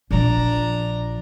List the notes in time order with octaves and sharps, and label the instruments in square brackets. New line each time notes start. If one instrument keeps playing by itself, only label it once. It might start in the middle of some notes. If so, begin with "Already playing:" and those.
[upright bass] A#1 F3 [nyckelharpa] D4 A#5